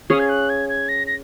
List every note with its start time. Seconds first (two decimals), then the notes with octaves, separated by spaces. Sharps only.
0.10 C#4 G#4 C#5 F5 D#6
0.19 G#6
0.29 F#6
0.49 G#6
0.69 G#6
0.89 A#6
1.07 A#6